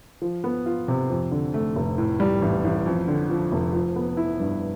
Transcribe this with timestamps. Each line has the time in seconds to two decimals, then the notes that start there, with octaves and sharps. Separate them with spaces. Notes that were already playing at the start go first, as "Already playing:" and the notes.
0.22 F3
0.44 B3
0.66 F4
0.88 C3
1.10 F2
1.31 D3
1.54 A3
1.76 F1
1.98 A2
2.20 G3
2.42 A1
2.64 A1
2.86 F2
3.08 D3
3.29 F3
3.52 F1
3.73 F3
3.96 B3
4.17 E4
4.40 G2